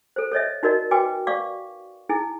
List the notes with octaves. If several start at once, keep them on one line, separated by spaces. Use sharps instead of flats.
A4 C5
A4 C#5 D#5 E5
D#4 F#4 A#4 D5 D#5
F#4 B4 G5 G#5 D6
D5 F5 C#6 D6
D#4 E4 G#4 G#5